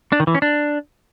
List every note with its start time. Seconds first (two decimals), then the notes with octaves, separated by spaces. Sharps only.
0.12 D4
0.20 D#3
0.27 E3
0.35 C#4
0.42 D4